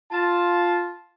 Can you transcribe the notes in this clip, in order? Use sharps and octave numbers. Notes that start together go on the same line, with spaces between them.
F4 A5